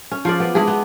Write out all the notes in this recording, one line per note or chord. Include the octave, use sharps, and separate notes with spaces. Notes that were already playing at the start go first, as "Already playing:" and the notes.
C#4
F3 F4 G#4 D5
B3 D5
G#3 D4 E4 G#4
B3